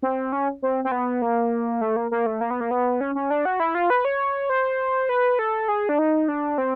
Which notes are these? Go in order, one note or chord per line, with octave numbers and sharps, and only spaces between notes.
C4
C#4
C4
C4
B3
A#3
A3
A#3
A#3
A3
A#3
B3
A#3
B3
C#4
C#4
D4
F#4
E4
F4
B4
C#5
C5
B4
A4
G#4
D4
D#4
D4
C4